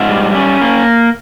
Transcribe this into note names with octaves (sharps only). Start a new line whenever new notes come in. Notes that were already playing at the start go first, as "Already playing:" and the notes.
Already playing: G#2 E5
G3
C#4
A#3